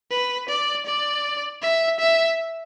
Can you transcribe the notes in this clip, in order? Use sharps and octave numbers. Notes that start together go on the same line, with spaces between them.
B4
D5
D5
E5
E5